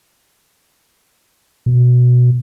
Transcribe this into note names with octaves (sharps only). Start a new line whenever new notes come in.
B2